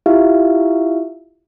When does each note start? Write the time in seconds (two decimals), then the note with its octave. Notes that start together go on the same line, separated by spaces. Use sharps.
0.06 E4 F4 G4 E5 F5